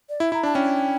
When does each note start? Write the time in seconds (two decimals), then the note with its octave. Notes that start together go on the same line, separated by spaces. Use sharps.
0.09 D5
0.20 E4 E5
0.32 E4 A#5
0.43 D4 A5
0.55 C#4 G5